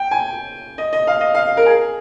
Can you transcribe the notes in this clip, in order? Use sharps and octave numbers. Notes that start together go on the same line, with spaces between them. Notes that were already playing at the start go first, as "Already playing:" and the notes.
Already playing: G5
G#5
D#5
D#5
F5
D#5
F5
A#4
G#4